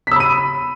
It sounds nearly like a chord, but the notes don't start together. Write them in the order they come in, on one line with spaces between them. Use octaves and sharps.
B6 E6 B5 D#7